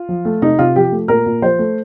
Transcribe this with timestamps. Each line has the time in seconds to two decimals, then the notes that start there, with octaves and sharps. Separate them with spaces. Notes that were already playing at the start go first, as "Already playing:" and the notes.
Already playing: F4
0.09 F3
0.25 A3
0.42 C3 D#4
0.59 C3 F4
0.76 F3 G4
0.92 A3
1.08 A#2 A#4
1.26 A#2
1.42 F3 C5
1.59 A3